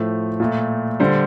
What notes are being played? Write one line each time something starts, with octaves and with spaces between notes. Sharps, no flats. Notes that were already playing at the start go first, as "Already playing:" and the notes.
Already playing: A2 F3 A3 C5
A#2 A3
D3 G3 C5